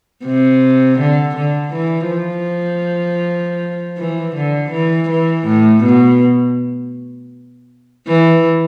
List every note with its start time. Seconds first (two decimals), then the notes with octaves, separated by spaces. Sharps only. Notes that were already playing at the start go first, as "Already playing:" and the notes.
0.24 C3
0.99 D3
1.36 D3
1.73 E3
2.11 F3
3.98 E3
4.35 D3
4.71 E3
5.09 E3
5.46 A2
5.84 B2
8.08 E3